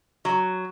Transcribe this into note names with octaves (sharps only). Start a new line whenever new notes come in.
F#3